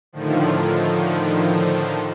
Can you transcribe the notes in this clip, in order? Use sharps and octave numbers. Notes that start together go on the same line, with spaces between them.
A2 D3 D#3 F3